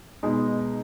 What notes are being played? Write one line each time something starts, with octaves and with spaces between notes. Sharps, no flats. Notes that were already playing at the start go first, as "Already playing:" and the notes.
B2 G#3 D#4